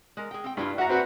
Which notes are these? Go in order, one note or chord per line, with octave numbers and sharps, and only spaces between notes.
G#3 A#4
G#4 G5
C4 G5
G2 D4 E4 F4
D4 F#4 E5 F#5 A#5
C4 F#4 B4